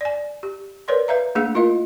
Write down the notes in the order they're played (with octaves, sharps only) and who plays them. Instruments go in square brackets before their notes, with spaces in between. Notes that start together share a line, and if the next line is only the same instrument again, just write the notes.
[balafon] D5 G#5
G4
A#4 B4 C#5 D5 C6
B4 E5 F5 A#5
A3 A#3 D4 G#4 F5
E4 F4 A#4 D#5 F5